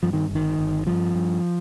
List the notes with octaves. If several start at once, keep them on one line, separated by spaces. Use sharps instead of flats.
G2 F3
D#3
G1 D#3
G1
G2 F3
G2